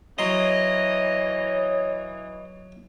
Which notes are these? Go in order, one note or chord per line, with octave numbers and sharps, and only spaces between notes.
E3 F#3 C#5 D#5 C6